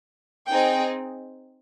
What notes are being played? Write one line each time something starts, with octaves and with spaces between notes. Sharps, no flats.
C4 D#4 G#4 G5